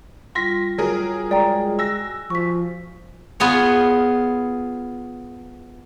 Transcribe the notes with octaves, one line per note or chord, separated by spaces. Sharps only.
G3 F4 C6 A#6 B6
F#3 G#4 A#4
G#3 D5 G5 A#5
F#4 G#5 E6 A#6
F3 C#6 B6
B3 F4 G#4 C#5